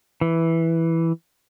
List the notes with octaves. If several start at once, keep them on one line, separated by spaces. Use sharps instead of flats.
E3